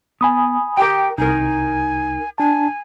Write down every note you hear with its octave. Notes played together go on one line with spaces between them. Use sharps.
B3 G#5 B5 D#6
G4 A#4 G5
C2 D#4 A#4 G#5
D4 G#5 A5